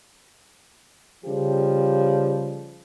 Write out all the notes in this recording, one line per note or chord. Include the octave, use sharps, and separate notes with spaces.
C#3 F3 G3 G4